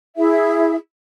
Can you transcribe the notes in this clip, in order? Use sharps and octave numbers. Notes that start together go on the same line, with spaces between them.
E4 G#4 E5